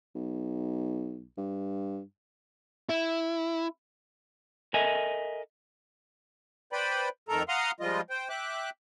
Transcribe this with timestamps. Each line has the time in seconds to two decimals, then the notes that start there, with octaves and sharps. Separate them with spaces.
0.15 B1
1.38 G2
2.89 E4
4.74 A4 A#4 D#5 E5 G#5
6.73 B4 C5 D5 G5 B5
7.29 F2 D#3 A3 A4 A#4 A#5
7.49 F5 F#5 A#5 C6 D#6 F6
7.80 F3 G3 G#3 F4 D#5
8.10 C5 G5
8.29 E5 G5 D6 F#6